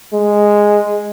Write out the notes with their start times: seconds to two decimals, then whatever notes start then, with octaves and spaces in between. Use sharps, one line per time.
0.13 G#3